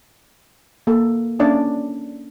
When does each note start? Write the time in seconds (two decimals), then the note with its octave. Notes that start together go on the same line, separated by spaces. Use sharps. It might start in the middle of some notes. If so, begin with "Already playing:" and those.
0.87 A#3 A4
1.39 A#3 C#4 D4 D5